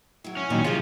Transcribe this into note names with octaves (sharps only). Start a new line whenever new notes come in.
F#3 E4
C#4
A#2 D#3 F#3 D#4
C3 F3 E4 F4 G#4 C#5